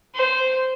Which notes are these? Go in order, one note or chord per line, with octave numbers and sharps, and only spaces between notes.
C5